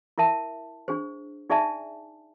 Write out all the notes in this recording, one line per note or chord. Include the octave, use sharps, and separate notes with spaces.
E4 A#4 E5 A5
D4 G#4 C5
D#4 G#4 D5 E5 G#5 A5